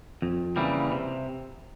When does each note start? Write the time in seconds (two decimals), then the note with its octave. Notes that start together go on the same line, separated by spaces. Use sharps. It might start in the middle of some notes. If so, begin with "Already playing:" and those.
0.22 F2
0.56 C#3 E3 G3 A#3
0.92 C3